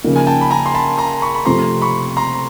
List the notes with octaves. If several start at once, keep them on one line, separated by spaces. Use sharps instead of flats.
C#3 F3 A#3 D#4
G#5
G5 A5
B5
G#5 A#5
C6
A5 B5
A#5 C6
B5 C#6
B5
C3 F3 A3 C4 A#5 C6
B5 C#6
A#5 C6